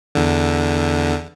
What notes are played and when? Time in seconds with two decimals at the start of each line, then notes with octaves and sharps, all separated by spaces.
0.15 E2 D3